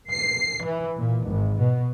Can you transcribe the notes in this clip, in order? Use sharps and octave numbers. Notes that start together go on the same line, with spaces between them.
C7
E3
A#2
G#1
B2